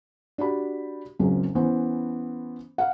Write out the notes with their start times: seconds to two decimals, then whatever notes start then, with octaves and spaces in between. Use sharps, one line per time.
0.38 D4 F#4 G4 B5
1.19 F#1 C#2 F#2 C4 C#4
1.55 E3 B3 C#4 E4 C5
2.78 F5 F#5